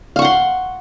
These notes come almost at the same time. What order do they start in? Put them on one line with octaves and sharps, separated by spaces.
F5 C#6 F#5 C6